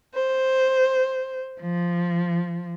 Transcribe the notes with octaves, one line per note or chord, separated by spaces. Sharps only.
C5
F3